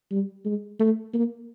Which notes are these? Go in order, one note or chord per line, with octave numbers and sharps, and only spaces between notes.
G3
G#3
A3
A#3